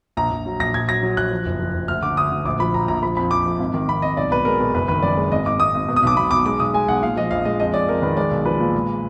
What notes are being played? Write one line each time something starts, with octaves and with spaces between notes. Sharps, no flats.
A#1 A#5
A#1
F#3
A#1 A#6
A#1 G#6
F#3 A#6
F#3
A#1 F#6
F3
F#1
F3
F#1
D2 F6
D3 D6
D2 D#6
D2
A#1 D6
F3 B5
A#1 A#5
A#1 A#5
F3 B5
F2 B5
F2 D6
F3
G#1
D#3
G#1 B5
G#1 D#5
B1 D5
B2 B4
G#3 A#4
B2
F#1 B4
D#3 B4
F#2 D5
G#3
G#1 D#5
G#1 D6
G#1 D#6
G#1
B2
D#6
B1 D6
B1 B5
B1 D6
G#3 D6
B1 D#6
G#3 G#5
B1 F#5
A#2 F5
F3 D#5
A#1 F5
G#3 D#5
F2 D#5
F2 D5
F2 A#4
D#3 B4
G#3 D5
B1
F3 B4
A#2
G#3